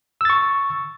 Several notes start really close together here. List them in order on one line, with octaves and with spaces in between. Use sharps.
E6 A6 C#6